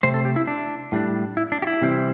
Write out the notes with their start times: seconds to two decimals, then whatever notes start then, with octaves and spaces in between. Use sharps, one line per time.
0.03 C3 A3 C4 C5
0.14 A4
0.25 G4
0.36 E4
0.47 D4
0.92 A2 G3 D4
1.37 E4
1.52 D4
1.62 G4
1.67 E4
1.82 C3 E3 G3 C4